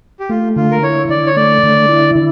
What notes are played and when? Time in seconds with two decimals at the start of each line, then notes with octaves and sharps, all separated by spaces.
0.20 G4
0.29 A3 F4
0.56 D3 F4
0.71 A#4
0.83 E4 C#5
1.09 D3 D5
1.26 C#5
1.36 A3 D5
1.63 D3
1.89 E4
2.15 D3